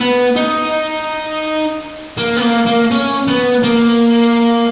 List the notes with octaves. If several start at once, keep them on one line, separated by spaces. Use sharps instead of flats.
B3
D#4
A#3
B3
A#3
A#3
C#4
B3
A#3